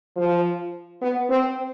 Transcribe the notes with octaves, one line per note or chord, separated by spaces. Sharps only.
F3
B3
C4